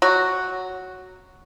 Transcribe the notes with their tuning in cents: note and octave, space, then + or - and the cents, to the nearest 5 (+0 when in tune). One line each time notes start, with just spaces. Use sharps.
F#3 +0 F#4 +0